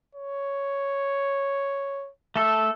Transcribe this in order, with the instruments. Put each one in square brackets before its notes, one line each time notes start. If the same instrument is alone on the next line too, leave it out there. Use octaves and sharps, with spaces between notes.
[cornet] C#5
[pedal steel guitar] A3 A4